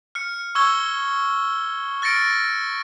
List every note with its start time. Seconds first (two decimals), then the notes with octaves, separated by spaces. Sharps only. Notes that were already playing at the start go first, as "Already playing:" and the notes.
0.15 F6 C#7
0.55 C#6 E6 G#6 G7
2.02 F6 A6 A#6 C#7 D7